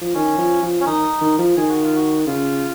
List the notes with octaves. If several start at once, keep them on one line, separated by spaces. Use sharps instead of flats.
F3
D#3 C#4
F3
F3
C#4
D#3 D#4
D#3
F3
D#3 G#4
F#4
F4
F#4
C#3 F4